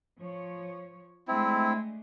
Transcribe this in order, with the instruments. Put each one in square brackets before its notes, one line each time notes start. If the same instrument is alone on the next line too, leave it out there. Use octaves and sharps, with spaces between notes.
[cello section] F3 C#5
[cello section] G#3 A3 D4 [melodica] C4 E4